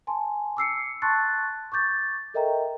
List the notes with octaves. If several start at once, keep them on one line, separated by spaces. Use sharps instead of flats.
G#5 A5 C6
D6 E6 C7 C#7
A5 C6 C#6 F#6 A6
C#6 D6 G6 A6
A4 A#4 D#5 E5 G5 A#5